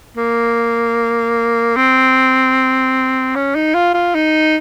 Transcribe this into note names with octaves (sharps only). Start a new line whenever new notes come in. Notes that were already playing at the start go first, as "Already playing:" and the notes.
A#3
C4
C#4
D#4
F4
F4
D#4